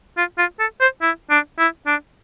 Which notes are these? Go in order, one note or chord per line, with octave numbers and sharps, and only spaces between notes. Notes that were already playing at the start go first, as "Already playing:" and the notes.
F4
F4
A4
C5
E4
D4
E4
D4